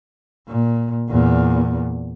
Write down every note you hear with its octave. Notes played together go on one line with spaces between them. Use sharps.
A#2
E2 A#2